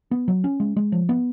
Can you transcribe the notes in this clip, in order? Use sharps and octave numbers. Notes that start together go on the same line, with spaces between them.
B3
F#3
C#4
G#3
G#3
F3
B3